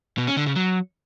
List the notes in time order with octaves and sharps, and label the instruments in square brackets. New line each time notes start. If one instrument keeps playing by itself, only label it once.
[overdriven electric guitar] B2
C#4
D3
C#3
F#3